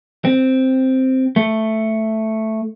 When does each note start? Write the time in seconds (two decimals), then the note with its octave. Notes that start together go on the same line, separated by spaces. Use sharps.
0.25 C4
1.36 A3